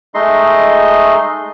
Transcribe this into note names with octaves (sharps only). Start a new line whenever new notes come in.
G#3 A3 D#4 D#5 C6